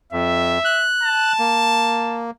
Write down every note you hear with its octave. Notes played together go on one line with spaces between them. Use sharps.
F2 E5
F#6
A5
A#3